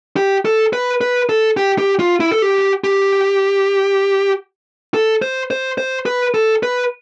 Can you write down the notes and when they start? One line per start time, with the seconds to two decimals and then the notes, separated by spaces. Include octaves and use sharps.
0.16 G4
0.45 A4
0.73 B4
1.01 B4
1.29 A4
1.57 G4
1.78 G4
2.00 F4
2.20 E4
2.32 A4
2.42 G4
2.84 G4
4.94 A4
5.22 C5
5.51 C5
5.78 C5
6.06 B4
6.34 A4
6.63 B4